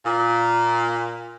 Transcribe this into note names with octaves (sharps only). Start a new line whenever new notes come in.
A#2